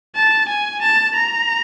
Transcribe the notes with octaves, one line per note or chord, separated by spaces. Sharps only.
A5
G#5
A5
A#5